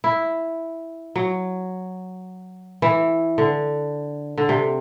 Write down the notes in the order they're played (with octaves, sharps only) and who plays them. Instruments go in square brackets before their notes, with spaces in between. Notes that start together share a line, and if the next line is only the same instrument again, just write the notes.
[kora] E4
F#3
E3
D3
D3
C3